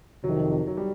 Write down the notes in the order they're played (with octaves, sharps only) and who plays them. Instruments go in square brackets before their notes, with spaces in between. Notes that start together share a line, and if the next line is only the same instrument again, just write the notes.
[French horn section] F2 C3 D#3 [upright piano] F#3
[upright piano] F#3
G3